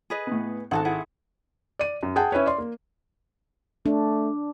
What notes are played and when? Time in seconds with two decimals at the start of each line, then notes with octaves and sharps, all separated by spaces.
0.10 G#4 B4 D#5
0.27 A2 B3
0.71 G#1 F#4 G#4 A4 F#5 A5
0.85 E4 G#4 F#5
1.79 D5 D#7
2.03 F#2
2.16 G#4 F#5 G5 A5
2.32 C#4 E4 B4 C#5
2.46 D5 C6
2.58 A#3
3.86 A3 D4